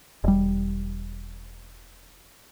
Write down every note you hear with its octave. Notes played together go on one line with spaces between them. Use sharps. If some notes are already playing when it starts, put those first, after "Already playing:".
E1 G3